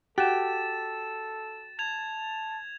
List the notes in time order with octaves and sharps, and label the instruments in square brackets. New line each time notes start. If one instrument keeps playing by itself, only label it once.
[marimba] F#4 F#5 [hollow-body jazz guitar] G4 [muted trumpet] A4 [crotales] A6 E7
[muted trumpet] A5 [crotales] G#6 F7